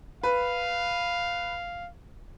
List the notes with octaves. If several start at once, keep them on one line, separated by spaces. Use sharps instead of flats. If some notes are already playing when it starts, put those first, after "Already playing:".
B4 F5